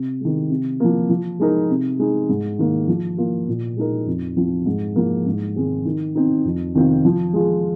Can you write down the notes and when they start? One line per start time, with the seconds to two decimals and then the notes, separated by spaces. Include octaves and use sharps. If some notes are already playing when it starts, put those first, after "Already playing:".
Already playing: C3
0.21 D#3 G#3
0.50 C3
0.80 F3 A#3
1.09 F3
1.39 G#3 D#4 A#4
1.70 C3
1.99 G#3 D#4
2.29 G#2
2.59 D#3 A#3
2.87 F3
3.17 A#3 F4
3.48 A#2
3.77 G#3 D#4 A#4
4.07 F2
4.37 F3 C4
4.66 G#2
4.96 F3 A#3
5.26 G#2
5.56 D#3 G#3 C4
5.85 D#3
6.15 C4 D#4
6.45 F2
6.75 C3 D#3 C4 F4
7.05 F3
7.33 G#3 F4 G#4